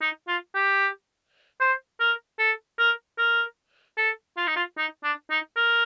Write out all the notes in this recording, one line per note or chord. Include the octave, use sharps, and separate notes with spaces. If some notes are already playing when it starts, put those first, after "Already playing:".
D#4
F4
G4
C5
A#4
A4
A#4
A#4
A4
F4
D#4
F4
D#4
D4
D#4
A#4